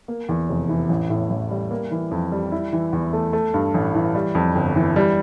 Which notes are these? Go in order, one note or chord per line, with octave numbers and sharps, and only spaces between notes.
A#3
E2
F1
E3
A1
A2
A1
G3
A#3
E3
F2
G3
E4
E3
E2
A3
A3
G2
A1
E3
G3
F2
G1
E3
G3